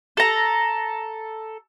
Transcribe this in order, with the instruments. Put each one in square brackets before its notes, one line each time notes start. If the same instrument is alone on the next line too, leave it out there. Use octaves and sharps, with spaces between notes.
[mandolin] A4 A#5